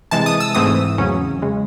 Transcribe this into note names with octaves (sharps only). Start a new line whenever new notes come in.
C3 E3 G#3 A5
D#6
E6
G#2 E3 A3 C4 D#6
E2 C#3 F#3 C#4
C#3 G#3